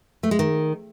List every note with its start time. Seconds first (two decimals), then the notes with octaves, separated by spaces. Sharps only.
0.23 A3
0.31 G#3
0.39 D#3